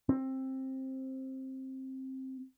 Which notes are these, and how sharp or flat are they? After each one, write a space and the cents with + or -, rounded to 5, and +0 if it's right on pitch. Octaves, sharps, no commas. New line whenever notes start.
C4 +15